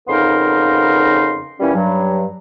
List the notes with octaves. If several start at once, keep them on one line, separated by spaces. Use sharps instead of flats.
F2 C#3 B3 D#4 A#4 C6
A#2 E3 G3 C#4
G2 F#3